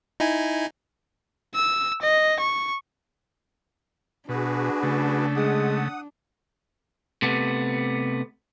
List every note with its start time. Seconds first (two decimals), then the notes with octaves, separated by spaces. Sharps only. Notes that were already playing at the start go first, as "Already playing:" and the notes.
0.20 D#4 E4 G#5
1.55 E6
2.02 D#5
2.40 C#6
4.29 B2 D4 F#4 G#4 B4
4.83 C#3 A3
5.36 G#3 F#5 D#6
7.22 C3 A3 B3